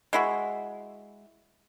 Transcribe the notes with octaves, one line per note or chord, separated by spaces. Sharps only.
G#3 E4 F#4